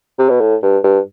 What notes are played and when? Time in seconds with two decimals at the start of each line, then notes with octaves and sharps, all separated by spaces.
0.19 C3
0.29 B2
0.40 A2
0.63 G2
0.84 G2